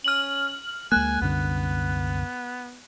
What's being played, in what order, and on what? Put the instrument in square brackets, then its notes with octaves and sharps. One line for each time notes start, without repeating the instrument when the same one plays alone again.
[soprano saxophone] C#4 [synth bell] F6 F#7
[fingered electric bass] D2 G#3 A#3 [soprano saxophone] G#5 [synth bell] F#6
[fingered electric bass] C2 F#2 D3 [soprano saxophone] B3